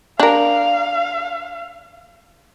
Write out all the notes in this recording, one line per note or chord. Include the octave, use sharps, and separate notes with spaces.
D4 A#4 F5